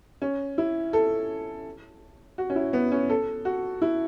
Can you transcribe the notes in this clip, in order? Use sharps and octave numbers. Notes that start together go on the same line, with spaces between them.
C#4
E4
A4
F#4
C#4
E4
B3
C#4
A4
F#4
E4